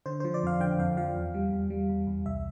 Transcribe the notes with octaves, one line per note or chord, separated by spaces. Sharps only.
D3 C5
C5
F3
D5
F2 F5
D3 G5
F2 F5
F3 F5
E2
G3
E2
G3
E2
E2
C2 E5